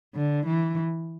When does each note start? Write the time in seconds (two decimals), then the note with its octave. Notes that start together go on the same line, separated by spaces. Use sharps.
0.15 D3
0.46 E3